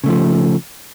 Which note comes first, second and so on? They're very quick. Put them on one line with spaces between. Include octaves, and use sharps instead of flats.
C#3 A3 F3